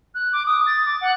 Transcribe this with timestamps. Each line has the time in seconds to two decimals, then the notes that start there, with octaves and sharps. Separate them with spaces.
0.15 F#6
0.33 D6
0.46 D#6
0.67 A6
0.85 D6
1.01 F#5